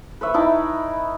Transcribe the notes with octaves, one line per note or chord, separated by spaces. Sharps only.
B4 C#5 E5
D#4 E4 G5 A5